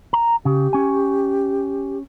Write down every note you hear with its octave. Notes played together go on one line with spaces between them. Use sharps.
A#5
C#3 G4
C#4 G#5